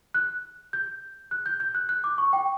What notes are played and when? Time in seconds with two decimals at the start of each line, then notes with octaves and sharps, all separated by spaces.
0.14 F#6
0.73 G6
1.31 F#6
1.46 G6
1.60 G6
1.75 F#6
1.89 F#6
2.04 D6
2.18 C#6
2.33 G5